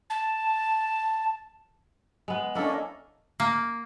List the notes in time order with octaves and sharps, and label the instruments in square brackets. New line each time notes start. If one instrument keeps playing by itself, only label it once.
[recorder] A5
[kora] G#3 B3
[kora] A#3 E4 A4 [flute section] C#4 D4 D#5
[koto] A#3